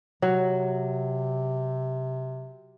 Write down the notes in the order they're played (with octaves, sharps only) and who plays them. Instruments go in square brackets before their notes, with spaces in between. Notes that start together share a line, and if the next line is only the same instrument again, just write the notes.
[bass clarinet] C3 [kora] F#3